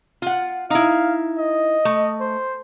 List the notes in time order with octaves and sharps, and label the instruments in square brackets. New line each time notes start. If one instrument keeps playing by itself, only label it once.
[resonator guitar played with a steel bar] F4 F#5
[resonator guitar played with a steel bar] D#4 E4 [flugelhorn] F5
[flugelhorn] D#5
[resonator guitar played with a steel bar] A3
[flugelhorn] C5